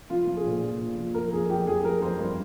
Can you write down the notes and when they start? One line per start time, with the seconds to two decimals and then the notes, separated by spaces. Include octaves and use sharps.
0.10 F3 F4
0.27 F3
0.37 G#4
0.46 A#2
0.63 F3
0.81 A#2
0.98 F3
1.14 F2 A#4
1.32 F2 G#4
1.50 F2 G4
1.67 F2 G#4
1.84 F2 A#4
2.02 F2 C5
2.19 G2